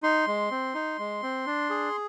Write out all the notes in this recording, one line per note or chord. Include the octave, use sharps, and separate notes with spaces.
D#4 C6
G#3
C4
D#4
G#3
C4
D4
G#4